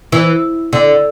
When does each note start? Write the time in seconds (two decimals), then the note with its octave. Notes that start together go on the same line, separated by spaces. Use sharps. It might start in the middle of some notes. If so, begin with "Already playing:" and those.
0.12 E3
0.73 D3